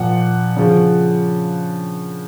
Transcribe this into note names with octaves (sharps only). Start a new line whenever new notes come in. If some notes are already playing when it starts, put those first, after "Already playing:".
Already playing: A#2 F3 F#5
C#3 F3